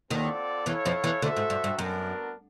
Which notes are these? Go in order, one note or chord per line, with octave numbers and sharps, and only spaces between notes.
D#2 D#3 C4 F4 A4 D5 F#5
E2 E3 E4 A4 C#5 F5
F2 F3
E2 E3
D2 D3 F#4 A4 C5 E5
G#2
G2
G2
F#2 B3 D4 F#4 A#4